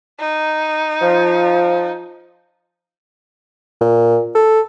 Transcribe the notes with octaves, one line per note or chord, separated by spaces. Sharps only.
D#4
F3
A#2
A4